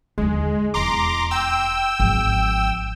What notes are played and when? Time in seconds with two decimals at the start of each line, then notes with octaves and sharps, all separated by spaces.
0.18 D#2 D3 G#3
0.74 D#1 E2 A#5 C6 D6
1.31 G5 E6
2.00 G#1 F3